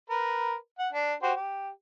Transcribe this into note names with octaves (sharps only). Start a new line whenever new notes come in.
A#4 B4
F#5
D4
F#4 G4 C5
G4